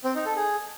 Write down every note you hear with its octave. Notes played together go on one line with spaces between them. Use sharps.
C4
D#4
A4
G#4